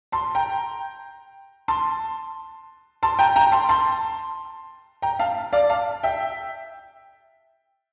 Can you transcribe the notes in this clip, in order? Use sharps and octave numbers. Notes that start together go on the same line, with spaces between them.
A5 C6
G5 A#5
A5 C6
A5 C6
G5 A#5
G5 A#5
A5 C6
A5 C6
G5 A#5
F5 A5
D5 F5
F5 A5
E5 G5